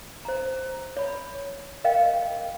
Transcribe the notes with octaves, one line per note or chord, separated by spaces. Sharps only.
C5 A#5
C#5 B5
A#4 D#5 F5 G5